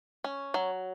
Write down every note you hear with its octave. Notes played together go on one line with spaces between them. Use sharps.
C#4
F#3